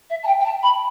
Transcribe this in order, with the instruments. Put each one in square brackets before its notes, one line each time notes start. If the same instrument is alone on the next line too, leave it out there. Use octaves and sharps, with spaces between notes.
[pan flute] E5
A5
G5
G5
A5
B5